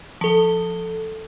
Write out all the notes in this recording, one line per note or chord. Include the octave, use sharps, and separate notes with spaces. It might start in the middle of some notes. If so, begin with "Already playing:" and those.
F3 A4